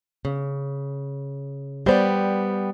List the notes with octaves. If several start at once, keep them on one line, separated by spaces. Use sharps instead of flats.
C#3
G3 B3 C5 D5 G5